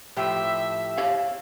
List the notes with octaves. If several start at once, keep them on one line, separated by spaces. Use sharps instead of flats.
A2 F3 G4 E5
G4 C#5 F5